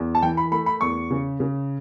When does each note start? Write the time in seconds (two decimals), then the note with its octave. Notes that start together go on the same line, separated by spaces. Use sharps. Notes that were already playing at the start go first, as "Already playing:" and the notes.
Already playing: E2
0.15 A5
0.22 E3 G5
0.37 B5
0.52 A3 B5
0.66 B5
0.81 E2 C#6
1.11 C#3
1.40 C#3